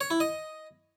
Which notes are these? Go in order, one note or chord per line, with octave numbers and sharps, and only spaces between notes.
C#5
E4
D#5